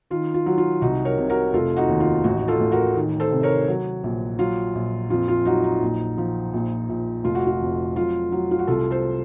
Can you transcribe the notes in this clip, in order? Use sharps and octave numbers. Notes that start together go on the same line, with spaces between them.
D#3 F4
F4
F#3
F4
C2 D#4 F#4
A#4 C#5
C3
F#4 A#4
F1 F4 A4
D#4 F#4
D#2
F4
A1 D#4 F#4
F4 A4
A1
F#4 A#4
D#3
A4 C5
C3
A#4 C#5
F#3
A#1
F#3 F4
A#1
F2 F4
F4
F#3 D#4 F#4
D#4
A#1
F3
A#1
A#1
F1 F4
F#4
F4
F2
F#3 F4
F#3
F4
F#4
C2 F4 A4
A4 C5